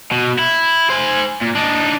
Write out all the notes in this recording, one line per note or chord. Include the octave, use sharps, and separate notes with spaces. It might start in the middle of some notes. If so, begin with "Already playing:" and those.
B2
E4
C5 G#5
A#2
D4 D#4